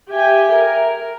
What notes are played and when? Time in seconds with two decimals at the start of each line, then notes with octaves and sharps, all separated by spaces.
0.11 G4 E5 G5 G#5
0.53 A#4